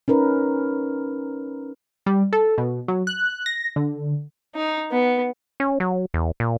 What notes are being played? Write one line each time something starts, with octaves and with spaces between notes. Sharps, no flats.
C#4 D#4 A#4 B4
G3
A4
B2
F#3
F#6
A#6
D3
D#4
B3
C#4
F#3
E2
A#2